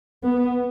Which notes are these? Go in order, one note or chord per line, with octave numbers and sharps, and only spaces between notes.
B3